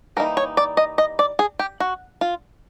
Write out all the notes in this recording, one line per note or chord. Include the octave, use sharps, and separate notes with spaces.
E3 G3 A#3 D#4 A#4
C#5
D5
D#5
D#5
D5
G#4
G4
F#4
F4